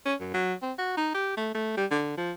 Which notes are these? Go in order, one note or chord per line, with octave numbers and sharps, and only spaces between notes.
C#4
F#2
F#3
C4
F#4
D#4
G4
A3
A3
G3
D3
F3